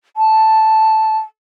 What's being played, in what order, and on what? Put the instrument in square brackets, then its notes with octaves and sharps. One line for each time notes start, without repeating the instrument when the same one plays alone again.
[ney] A5